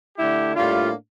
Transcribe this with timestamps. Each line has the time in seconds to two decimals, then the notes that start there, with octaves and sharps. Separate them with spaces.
0.18 D3 A3 E4 G4
0.55 A2 G3 A#3 D4 F4